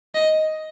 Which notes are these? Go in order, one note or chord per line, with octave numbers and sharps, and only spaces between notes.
D#5